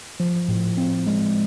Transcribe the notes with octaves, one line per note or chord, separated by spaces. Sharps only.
F3
A2
C4
G#3